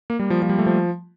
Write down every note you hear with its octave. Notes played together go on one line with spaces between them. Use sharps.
A#3
G3
F3
F3
G3
A3
F3